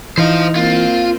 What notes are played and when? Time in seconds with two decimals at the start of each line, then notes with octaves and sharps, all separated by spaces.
0.18 E3 D#4 C5 F5
0.56 A#3 C4 F4